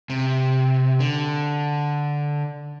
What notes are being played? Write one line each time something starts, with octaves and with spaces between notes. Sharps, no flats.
C3
D3